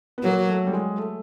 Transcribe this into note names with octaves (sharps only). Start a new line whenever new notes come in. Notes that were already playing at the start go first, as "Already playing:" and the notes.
B3
F#3 A#3
A3
G3
G#3
A3